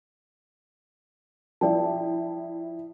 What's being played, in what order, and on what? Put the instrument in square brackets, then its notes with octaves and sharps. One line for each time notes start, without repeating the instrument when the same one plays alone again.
[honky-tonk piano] F3 E4 [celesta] D5 G5 A5